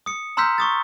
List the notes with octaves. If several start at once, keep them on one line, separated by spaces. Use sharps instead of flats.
D#6 C#7
A#5 C6 E6 F6 G6 B6
C#6 D#6 A6